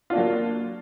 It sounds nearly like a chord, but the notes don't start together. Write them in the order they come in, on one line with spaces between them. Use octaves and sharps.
F4 D4 A#3 F#3